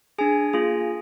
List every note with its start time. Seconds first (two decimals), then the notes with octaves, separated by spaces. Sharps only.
0.18 D4 G#4 G#5
0.53 A#3 F4 G#4